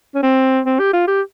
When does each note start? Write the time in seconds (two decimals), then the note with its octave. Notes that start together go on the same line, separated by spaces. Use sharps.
0.15 C#4
0.23 C4
0.66 C4
0.79 G4
0.93 F4
1.08 G4